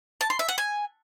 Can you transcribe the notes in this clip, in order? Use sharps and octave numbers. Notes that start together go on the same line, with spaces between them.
A5
C6
E5
F#5
G#5